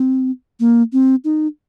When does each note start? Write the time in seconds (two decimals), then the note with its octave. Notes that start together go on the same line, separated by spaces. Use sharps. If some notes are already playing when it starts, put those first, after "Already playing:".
Already playing: C4
0.60 A#3
0.93 C4
1.24 D#4